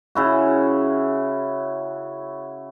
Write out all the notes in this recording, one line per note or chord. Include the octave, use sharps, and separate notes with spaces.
C#3 E4 F#4